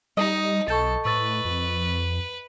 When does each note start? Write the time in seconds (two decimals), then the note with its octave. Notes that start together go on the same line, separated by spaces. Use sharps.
0.17 G3 D#4 D#5
0.68 B1 A4 C#6 G6 A6
1.05 A2 B4 C#6 E6 A6
1.45 F2